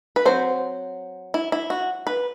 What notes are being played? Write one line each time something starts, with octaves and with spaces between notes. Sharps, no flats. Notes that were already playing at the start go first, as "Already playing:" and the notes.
B4
F#3 C4 C5
E4
E4
F#4
B4